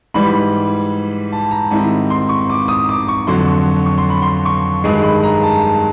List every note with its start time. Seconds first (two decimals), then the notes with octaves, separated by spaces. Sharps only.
0.14 G#2 E3 G3 B5
1.32 A5
1.51 A#5
1.71 G#2 D#3 G3 C4 E4
2.10 C6
2.29 C#6
2.50 D6
2.68 D#6
2.89 D6
3.08 C#6
3.27 F2 D3 F#3 C6
3.47 C#6
3.86 C#6
3.98 C6
4.10 B5
4.22 C6
4.45 C#6
4.84 G2 D#3 G#3
5.03 B5
5.24 A#5
5.43 A5